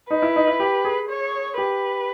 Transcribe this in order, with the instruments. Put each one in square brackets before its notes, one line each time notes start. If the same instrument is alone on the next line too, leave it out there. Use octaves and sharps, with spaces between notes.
[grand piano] D#4 [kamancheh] B4
[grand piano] E4
D#4
E4
G4
G#4
[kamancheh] C#5
[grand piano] G4 [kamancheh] B4